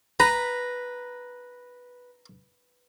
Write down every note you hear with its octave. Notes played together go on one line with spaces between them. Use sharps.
B4 A#5